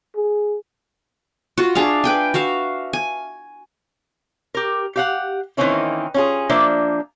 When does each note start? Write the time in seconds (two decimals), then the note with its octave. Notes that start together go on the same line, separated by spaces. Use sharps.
0.16 G#4
1.58 F4 F#4
1.75 D4 G#4 E5 F5
2.04 B4 G5 G#5
2.34 F#4 E5 F5
2.93 G#5
4.54 G4 A#4
4.96 G4 F5 F#5
5.57 D#3 E3 A#3 C4 C#4 E4
6.14 C#4 F4 G#4
6.49 F3 A#3 D4 E5